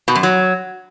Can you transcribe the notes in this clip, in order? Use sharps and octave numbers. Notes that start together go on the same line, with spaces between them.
B2
F#2
F#3